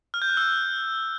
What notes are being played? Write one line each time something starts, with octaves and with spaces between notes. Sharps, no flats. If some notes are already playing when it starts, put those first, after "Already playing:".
F6
G6
F#6
E6